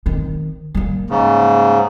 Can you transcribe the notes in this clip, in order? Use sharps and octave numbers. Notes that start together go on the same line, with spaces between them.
D#3 C4
G3 A#3
G#2 C#3